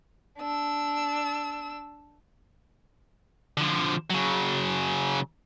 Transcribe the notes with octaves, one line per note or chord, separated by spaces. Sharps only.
D4 E6
D3 F3
C#3 F#3